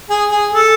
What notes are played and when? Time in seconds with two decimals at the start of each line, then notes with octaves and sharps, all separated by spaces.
0.10 G#4
0.30 G#4
0.52 A4